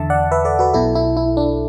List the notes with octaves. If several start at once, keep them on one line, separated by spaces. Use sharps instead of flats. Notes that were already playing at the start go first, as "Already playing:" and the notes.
Already playing: E2 D3 E5 A5
D5 F#5
B4 E5
A4 D5
F#4 B4
B1 B2 E4 A4
E4
E4
D4